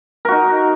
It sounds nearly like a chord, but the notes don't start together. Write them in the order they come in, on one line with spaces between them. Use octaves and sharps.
A#4 F#4 D#4